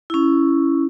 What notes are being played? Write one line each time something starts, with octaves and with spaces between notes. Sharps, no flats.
C#4 E4